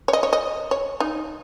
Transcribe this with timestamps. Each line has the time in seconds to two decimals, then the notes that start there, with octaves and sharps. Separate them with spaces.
0.08 C#5
0.13 D#5
0.23 C#5
0.33 D#5
0.71 C#5
1.00 D#4